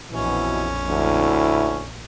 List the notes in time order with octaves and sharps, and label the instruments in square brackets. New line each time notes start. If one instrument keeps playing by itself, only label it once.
[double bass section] A#1 F2 [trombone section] B2 E3 [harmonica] C#4
[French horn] D2 [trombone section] E4